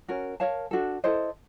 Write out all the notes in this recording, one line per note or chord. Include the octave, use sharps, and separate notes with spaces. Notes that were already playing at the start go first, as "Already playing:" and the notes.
C#4 F#4 A#4
A#4 C#5 F5 A5
D4 F#4 A4
E4 A4 C5 D#5